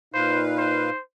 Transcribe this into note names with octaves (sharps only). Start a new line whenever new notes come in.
A#2 D#4 B4 C5 F5
C5